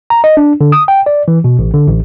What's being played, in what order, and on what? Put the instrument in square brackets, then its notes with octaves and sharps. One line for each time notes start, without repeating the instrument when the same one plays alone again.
[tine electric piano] A#5
D#5
D4
D3
D#6
G5
D5
E3
B2
A1
D3
A1